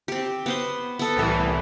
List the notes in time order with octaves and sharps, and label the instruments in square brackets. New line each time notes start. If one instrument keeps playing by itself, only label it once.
[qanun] C4 G4
B3 C5 C6
B3 A4
[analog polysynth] C2 A2 E3